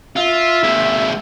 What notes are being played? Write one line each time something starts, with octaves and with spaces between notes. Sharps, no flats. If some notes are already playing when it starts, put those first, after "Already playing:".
F4 E5
G#3 A#3